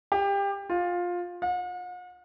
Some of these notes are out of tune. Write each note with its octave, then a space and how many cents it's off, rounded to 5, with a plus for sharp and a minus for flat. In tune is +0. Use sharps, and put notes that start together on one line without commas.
G4 +25
F4 +15
F#5 -45